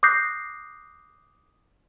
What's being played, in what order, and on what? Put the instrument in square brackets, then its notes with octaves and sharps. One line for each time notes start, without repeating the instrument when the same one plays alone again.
[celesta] D6 D#6 F#6 G6 A#6 C7